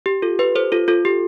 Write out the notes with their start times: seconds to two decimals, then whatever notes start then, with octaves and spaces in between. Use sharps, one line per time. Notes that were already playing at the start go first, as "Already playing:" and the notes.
0.06 G4
0.22 F4 A4
0.39 G4 B4
0.55 A4 C5
0.72 F4 A4
0.88 F4 A4
1.05 G4